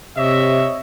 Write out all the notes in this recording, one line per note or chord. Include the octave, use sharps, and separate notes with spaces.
C3 C#5 D#5 E5